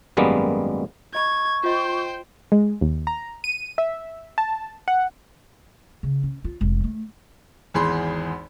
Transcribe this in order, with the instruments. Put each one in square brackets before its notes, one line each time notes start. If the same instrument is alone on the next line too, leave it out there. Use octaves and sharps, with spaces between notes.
[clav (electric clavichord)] G#1 F#2 G3 G#3 A#3 B3
[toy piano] D#5 B5 [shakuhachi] C#6 [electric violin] G#6
[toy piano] F4 D#5 [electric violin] C5 G5
[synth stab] G#3
D#2
A#5
D#7
E5
A5
F#5
[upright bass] C#3
C#4
F4
F1 G#3
G#3 A3
[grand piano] G#1 E2 G#4 B5 C6